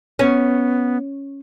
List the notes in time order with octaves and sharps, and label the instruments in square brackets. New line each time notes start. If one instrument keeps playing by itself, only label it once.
[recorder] B3 [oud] C#4